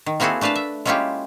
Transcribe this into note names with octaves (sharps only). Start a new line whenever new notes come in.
D#3
A#3 C4 E4 F#4 G#4 A4
A3 D4 B4 F5 A5
E5
G#3 A#3 C#4 E4 F4 G4